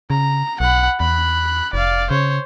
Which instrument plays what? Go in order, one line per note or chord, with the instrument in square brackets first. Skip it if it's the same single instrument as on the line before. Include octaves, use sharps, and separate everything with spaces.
[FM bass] C#3 [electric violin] A#5
[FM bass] B1 [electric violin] F#5 B5
[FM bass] E2 [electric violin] B5 F#6
[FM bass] F1 [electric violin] D5 F5
[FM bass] C#3 [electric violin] C5 C#5